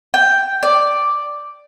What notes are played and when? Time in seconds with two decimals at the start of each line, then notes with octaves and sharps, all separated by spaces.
0.14 G5
0.63 D5